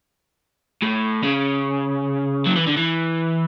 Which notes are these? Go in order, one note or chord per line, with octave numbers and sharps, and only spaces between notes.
A2
C#3
F#3
E3
D3
E3